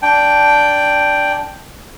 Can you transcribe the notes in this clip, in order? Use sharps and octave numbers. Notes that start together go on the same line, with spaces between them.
D4 G5